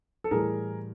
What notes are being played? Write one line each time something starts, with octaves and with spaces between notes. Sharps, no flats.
A4
A2 E3 G3 G#4 A#4